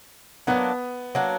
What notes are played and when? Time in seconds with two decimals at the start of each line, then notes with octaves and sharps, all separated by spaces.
0.47 F#3 A#3 B3 D4
1.15 F#3 A#3 D4